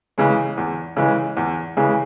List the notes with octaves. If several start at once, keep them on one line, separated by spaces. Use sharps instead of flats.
C#3 E3 G#3
E2
C#3 E3 G#3
E2
C#3 E3 G#3